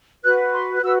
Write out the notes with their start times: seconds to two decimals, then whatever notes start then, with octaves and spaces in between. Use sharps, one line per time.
0.24 F#4 B4 F#6
0.53 C6
0.75 F#6
0.82 F#4 B4 E6